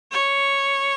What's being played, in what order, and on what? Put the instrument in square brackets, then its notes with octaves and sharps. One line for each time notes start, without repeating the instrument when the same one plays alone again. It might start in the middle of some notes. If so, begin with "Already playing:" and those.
[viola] C#5